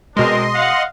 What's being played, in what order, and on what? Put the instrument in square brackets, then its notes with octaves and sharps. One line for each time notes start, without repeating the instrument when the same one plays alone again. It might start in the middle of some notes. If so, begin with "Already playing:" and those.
[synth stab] B2 G#3 [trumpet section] C4 D4 A#4 [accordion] D#5 C6
[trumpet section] F5 F#5